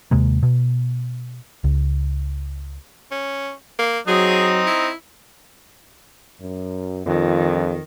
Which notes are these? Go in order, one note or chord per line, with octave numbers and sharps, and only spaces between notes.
D#2 C3 G#3 A#3
B2
C#2
C#4
A#3
F#3 C4 D#4 G#4
E4
F#2
F2 D#3 G3 D4 F4